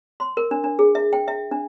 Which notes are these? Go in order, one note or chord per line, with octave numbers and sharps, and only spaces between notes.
C6
A#4
D4
D4
G#4
E5
G5
E5
D4